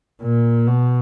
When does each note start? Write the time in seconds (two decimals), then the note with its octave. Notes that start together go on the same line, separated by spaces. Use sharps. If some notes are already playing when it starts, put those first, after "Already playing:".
0.22 A#2
0.67 B2